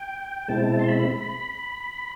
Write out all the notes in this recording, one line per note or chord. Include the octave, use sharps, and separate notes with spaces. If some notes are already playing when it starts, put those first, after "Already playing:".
Already playing: G5
B2 G#3 C4 E4 A5
C6
B5